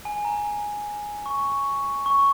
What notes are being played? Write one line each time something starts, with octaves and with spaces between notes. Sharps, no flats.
G#5
A#5
C#6
C#6